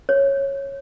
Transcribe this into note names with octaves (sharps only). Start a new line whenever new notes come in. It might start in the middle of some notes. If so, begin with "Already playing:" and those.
C#5